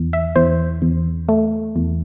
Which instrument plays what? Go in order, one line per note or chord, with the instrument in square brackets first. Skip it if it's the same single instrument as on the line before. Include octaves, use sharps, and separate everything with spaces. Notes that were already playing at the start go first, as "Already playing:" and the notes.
Already playing: [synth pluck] E2
E5
E2 C5
E2
A3
E2